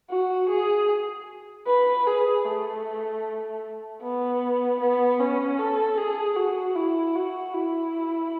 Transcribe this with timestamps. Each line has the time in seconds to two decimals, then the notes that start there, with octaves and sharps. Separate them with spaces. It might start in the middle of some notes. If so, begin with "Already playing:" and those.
0.10 F#4
0.49 G#4
1.66 B4
2.06 G#4
2.45 A3
4.02 B3
4.80 B3
5.20 C#4
5.59 A4
5.98 G#4
6.36 F#4
6.75 E4
7.15 F#4
7.54 E4